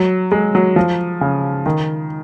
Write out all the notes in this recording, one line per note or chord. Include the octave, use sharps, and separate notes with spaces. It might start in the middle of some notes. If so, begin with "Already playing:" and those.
Already playing: F#3
G#3
F#3
F3
C#3
D#3